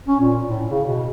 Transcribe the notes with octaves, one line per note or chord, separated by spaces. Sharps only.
C#4
A#2
A2
C#3
B2